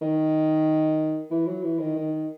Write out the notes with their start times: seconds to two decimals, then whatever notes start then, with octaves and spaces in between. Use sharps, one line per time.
0.01 D#3
1.30 E3
1.46 F#3
1.63 E3
1.79 D#3
1.96 D#3